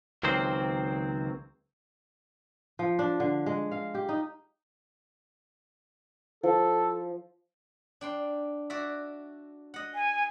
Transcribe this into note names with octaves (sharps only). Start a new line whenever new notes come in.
C#2 D#3 F#3 A#3 C4 C5
F3
D4
D3
G#3
F5
G4
D#4
F3 A4
D4 G5 C6
F#4 D5 E5
D#5 F#5
G#5